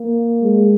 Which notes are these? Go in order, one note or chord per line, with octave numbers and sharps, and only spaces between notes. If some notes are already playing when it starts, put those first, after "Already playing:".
Already playing: A#3
G#3